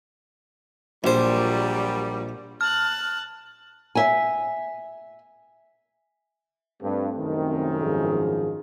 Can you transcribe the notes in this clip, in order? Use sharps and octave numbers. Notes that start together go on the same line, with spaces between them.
A#1 A#2 F#3 G3 C5
A5 F6 F#6
E5 G#5
G2 A3 C4 A4
C2 F#2 D#3
G#2 F3 G#4